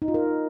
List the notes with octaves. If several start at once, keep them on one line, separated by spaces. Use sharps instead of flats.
D#4
F4
A#4